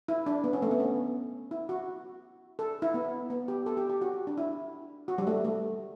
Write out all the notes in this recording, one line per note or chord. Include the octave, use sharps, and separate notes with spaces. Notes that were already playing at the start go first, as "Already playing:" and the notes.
E4
D4
B3
C#4
A3
B3
C#4
E4
F#4
A4
E4
B3
B3
G4
A4
G4
G4
F#4
D4
E4
F#4
G3
A3
A3